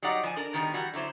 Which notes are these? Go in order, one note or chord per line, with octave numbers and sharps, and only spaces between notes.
F#3 G3 D#4 D5 F#5
F3 G#5
D4 A#4
B2 D#3 G3 B3 A#4
E3 G3 F#4
D3 F#3 E4 C5